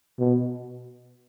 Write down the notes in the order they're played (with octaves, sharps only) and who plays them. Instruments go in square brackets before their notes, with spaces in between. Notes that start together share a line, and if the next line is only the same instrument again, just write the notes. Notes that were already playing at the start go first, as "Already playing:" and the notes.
[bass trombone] B2